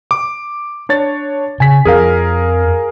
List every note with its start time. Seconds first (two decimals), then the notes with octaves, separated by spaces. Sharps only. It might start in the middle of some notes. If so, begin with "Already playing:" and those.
0.11 D6
0.89 D4 C#5 A6
1.60 C#3 G#5 B6
1.85 F2 F3 G#4 A#4 F5